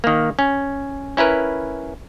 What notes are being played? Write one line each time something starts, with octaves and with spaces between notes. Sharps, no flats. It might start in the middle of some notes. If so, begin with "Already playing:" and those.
D#3 A#3
C#4
C#4 E4 A#4 B4